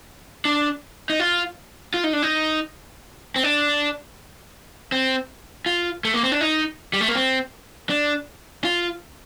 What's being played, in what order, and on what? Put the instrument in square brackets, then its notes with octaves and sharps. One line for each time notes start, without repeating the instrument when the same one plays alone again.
[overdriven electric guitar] D4
D#4
F4
F4
D#4
D4
D#4
C4
D4
C4
F4
A3
A#3
C4
D4
D#4
G3
A3
A#3
C4
D4
F4